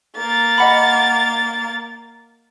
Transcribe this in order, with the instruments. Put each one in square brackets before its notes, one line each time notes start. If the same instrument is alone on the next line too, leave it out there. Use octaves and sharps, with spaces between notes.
[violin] A#3 A6
[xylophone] D#5 F#5 B5